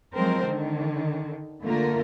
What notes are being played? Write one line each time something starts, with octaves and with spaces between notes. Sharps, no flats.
F3 F#3 G#3 C4 A#4 C5
D3 D#3
D3 A3 A#3 F4 A#4